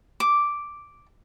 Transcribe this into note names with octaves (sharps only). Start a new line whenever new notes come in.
D6